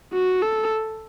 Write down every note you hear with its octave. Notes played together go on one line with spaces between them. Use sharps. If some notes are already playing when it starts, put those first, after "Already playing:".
F#4
A4